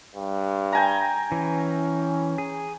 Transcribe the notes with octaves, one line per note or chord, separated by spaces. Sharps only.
G2
G5 G#5 A#5
E3 C#4
G#4